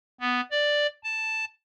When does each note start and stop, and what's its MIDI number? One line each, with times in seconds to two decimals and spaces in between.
0.20 0.41 59
0.51 0.87 74
1.03 1.45 81